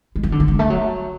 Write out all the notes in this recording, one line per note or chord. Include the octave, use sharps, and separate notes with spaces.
G#3
E3
D3
A3
G#3
A3
F#3